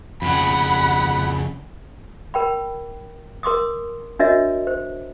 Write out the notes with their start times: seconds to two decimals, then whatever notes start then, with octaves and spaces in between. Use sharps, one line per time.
0.22 F2 C#3 F#5 B5
2.34 A#4 G5 B5
3.43 A#4 C6 D6 D#6
4.19 D4 F#4 A#4 C#5 D#5 E5
4.67 C5